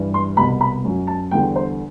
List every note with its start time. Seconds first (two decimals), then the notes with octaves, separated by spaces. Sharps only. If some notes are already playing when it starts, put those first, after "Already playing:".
Already playing: G2 E3 G3
0.14 C6
0.37 C2 B2 G3 B5
0.61 B5
0.84 F#2 F#3
1.07 A5
1.31 E2 D3 G3 G5
1.56 C5